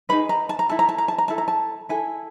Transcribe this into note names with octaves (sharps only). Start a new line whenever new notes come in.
D#4 G#4 B4 B5
A#5
A5
A#5
E4 A4 A5
A#5
A5
A#5
A5
A#5
E4 A4 A5
A#5
A5
E4 A4 G#5